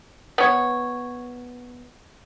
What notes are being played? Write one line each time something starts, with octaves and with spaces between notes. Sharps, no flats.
B3 C#5